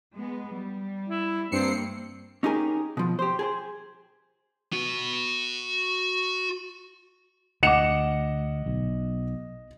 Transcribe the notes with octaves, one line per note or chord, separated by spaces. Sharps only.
G#3 B3
G3
E4
G2 A#3 C4 C7 C#7
C#4 D#4 G4 G#4 A#4
B2 F3
G4 C5
G#4 A4 C5
F#4 B5
D2 D#5 F#5 D6 C#7 E7
B1